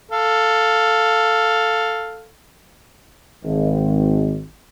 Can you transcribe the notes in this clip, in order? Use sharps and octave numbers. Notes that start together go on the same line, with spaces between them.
A4 F5
G#1